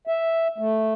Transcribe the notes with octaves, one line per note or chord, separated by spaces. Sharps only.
E5
A3